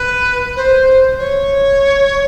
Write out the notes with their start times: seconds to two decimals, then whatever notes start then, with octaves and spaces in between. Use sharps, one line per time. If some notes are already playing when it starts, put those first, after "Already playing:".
Already playing: B4
0.56 C5
1.19 C#5